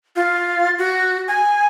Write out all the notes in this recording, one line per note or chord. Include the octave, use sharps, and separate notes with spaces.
F4
F#4
G#5